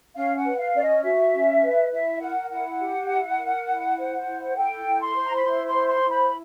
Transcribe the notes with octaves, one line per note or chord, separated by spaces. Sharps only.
C#4 F5
F#5
B4
F5
C#4 D5
D#5
F#4 E5
C#4
B4
E4 E5
A#4 F#5
E4 F#5
G4
E4
A#4
E4
C5
E4
A4 G5
E4
C6
C5
A#5
B5
E4 C6
C6
C5
C6
E4
B5